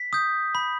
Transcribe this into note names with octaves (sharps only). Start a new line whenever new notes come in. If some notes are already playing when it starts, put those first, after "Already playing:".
Already playing: B6
D#6 G6
B5